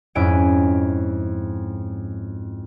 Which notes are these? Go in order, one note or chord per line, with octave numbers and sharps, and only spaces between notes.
F2 G#2 C#4 E4 G#5 D7